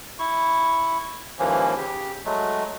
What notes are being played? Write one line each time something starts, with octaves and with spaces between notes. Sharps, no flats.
E4 C#6
D#2 G#2 E3 F3 A#3 C#4
C#3 G4
F#3 G#3 A3